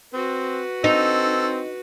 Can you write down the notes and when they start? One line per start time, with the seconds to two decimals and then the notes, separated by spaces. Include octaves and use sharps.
0.13 C4 F#4 B4
0.84 C4 D#4 A4